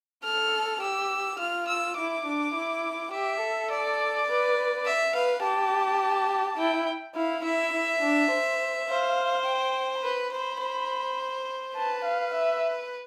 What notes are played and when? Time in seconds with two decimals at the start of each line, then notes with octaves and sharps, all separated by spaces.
0.24 A4 F6
0.81 G4 E6
1.39 F4 F6
1.68 E6
1.97 E4 D6
2.26 D4
2.55 E4
3.12 G4 E5
3.41 A4
3.71 D5
4.28 B4
4.86 E5
5.14 B4 F5
5.42 G4 A5
6.58 E4 G5
7.15 E4 F5
7.44 E4 E5
7.73 E4
8.02 D4
8.31 C5
8.89 C5 F5
9.46 G5
10.03 B4 B5
10.32 C5
10.61 C5
11.76 B4 A5
12.05 F5
12.34 E5